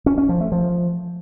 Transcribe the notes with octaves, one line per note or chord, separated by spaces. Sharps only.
C#4
C#4
F3
A3
F3